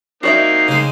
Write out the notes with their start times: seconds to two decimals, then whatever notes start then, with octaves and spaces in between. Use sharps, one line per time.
0.23 A#3 C4 D#4 F#4 D5 E5 C7
0.68 C#3 G#3